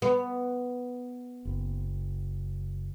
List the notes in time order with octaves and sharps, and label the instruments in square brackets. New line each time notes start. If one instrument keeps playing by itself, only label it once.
[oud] B3
[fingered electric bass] F#1